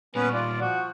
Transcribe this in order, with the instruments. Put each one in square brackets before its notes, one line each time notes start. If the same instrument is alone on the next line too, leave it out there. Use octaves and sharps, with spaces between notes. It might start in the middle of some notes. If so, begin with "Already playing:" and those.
[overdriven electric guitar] A#2 G3 [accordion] B3 C#4 B4
[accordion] F4 [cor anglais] D5
[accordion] F3 [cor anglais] F#4